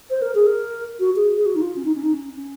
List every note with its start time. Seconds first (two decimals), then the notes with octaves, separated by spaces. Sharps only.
0.10 C5
0.22 A#4
0.35 G#4
0.47 A#4
1.00 F#4
1.16 G#4
1.37 G#4
1.46 F#4
1.56 D#4
1.61 F4
1.76 C#4
1.85 D#4
1.95 C#4
2.03 D#4
2.14 C#4
2.36 C#4